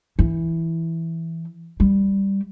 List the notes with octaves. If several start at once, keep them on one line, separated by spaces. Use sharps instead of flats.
E3
G3